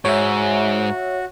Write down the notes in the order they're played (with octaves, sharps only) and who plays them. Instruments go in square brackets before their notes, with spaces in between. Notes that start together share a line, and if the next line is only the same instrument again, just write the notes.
[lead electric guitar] G#2 [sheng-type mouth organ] F#4 [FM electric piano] C#5 E5